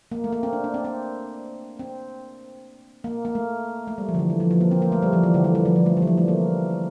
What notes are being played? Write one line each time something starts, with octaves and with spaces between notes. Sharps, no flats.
A#3
A3
A#3
C4
D4
D4
C4
C4
C4
A#3
A#3
A3
A3
G3
F3
D3
E3
E3
F3
F3
A#3
C4
A#3
A3
G3
F3
E3
D3
E3
G3
F3
F3
A3
G3
E3
F3
A3
A#3